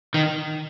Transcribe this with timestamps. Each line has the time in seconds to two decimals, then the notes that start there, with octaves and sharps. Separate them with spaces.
0.14 D#3